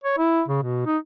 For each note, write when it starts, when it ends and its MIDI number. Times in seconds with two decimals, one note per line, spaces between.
0.04 0.17 73
0.18 0.42 64
0.48 0.62 49
0.63 0.84 47
0.86 0.97 63